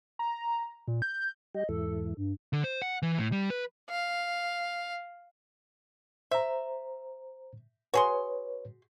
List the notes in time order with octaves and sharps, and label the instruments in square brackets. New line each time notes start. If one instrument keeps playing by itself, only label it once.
[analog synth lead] A#5
A#2
G6
[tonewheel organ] G3 G4 [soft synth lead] D#5
[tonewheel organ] E2 G#2 E3 [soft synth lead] A4
[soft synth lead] G2
[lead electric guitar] D3
C5
F#5
E3
A2
G3
B4
[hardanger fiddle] F5
[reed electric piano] C5 A#5 [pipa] E5
[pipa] F#4 G#4 C6 [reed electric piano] B4 C#5